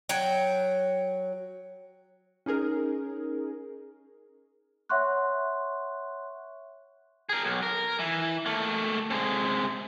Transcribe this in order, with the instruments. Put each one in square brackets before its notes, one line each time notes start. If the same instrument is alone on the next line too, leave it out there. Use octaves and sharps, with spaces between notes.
[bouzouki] F#3 C#5 G5
[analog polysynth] C#4 D#4 G#4 A#4
[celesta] C#5 E5 F#5 C6 C#6 F#6
[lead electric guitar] G#4 A#4
B1
A#4
E3
A3 A#3
C3 G#3